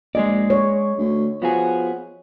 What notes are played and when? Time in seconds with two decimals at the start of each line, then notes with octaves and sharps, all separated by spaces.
0.15 A#1 G#3 G#4 D5 D#5
0.50 C#5
0.98 D2
1.42 F3 B3 F#4 G#4